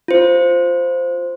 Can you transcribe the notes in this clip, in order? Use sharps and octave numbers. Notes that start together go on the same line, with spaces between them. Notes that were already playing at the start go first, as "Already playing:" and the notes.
F4 C5